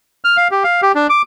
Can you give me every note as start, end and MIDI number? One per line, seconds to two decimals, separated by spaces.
0.25 0.37 89
0.37 0.48 77
0.51 0.64 67
0.64 0.81 77
0.82 0.92 67
0.95 1.07 62
1.10 1.22 86